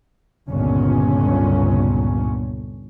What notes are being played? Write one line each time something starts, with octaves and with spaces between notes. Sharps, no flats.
G1 C#2 G2 A#2 D3 C#4